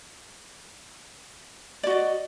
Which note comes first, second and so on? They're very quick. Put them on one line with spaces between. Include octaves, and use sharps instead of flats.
D5 F#4 D#5